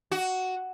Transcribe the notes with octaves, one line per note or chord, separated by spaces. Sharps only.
F#4